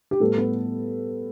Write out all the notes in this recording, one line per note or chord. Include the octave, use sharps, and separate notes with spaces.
G4
A2 G3 B3 A4
B3 B4